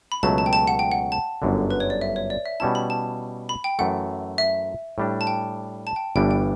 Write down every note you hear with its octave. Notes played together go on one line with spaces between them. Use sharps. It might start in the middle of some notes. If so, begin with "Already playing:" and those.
B5
C#2 B2 F#3 A3 A5
A5
G5
A5
F#5
G5
F#5
A5
G1 F#2 D3
B4
C#5
D5
E5
C#5
D5
E5
B2 G3 C#4 E4 A5
B5
A5
B5
G5
F#2 E3 A3 F#5
E5
A2 G3 D4
A5
G5
A5
G5
G1 G2 E3 G3 D4 G5
G5